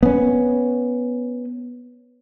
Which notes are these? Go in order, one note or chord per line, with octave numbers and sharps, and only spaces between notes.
B3 C#4